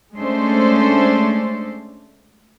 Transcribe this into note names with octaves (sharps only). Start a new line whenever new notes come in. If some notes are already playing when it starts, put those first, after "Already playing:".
G#3 A3 C#4 D4 A4 C5